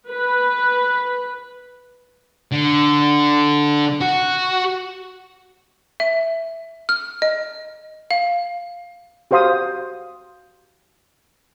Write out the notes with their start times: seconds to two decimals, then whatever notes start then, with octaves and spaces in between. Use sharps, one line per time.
0.12 B4
2.51 D3
4.01 F#4
6.00 E5
6.89 F6
7.22 D#5
8.11 F5
9.31 F#4 G4 C5 F5 C6 D#6